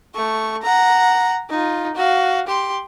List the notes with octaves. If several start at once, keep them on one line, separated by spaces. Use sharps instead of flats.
A3 C#6
F#5 A#5
D#4 F4
F#4 F5
G4 C6